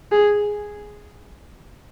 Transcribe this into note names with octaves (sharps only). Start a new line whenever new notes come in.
G#4